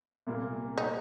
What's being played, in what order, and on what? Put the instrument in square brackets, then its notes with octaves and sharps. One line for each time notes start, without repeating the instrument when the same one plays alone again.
[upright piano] C2 A#2 A#3
[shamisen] D#4